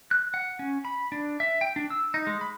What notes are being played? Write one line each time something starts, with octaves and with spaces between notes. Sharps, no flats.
F#6
F#5
C#4
B5
D4
E5
G5
D4
E6
D#4
G#3
B5